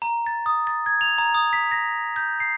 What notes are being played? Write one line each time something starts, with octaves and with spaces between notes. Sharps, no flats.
A#5
A6
D#6
A6
G#6
F7
A#5
D#6
B6
A#6
G6
C7